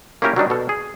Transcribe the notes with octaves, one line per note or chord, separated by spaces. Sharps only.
A#3 C#4 E4 G4 A#4 G#5
F#3 G3 D4 D#4
B2 A4
G#4